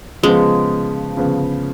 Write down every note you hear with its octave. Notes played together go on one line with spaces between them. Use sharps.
C#3 F3 G#3 B3
C#3 F3 B3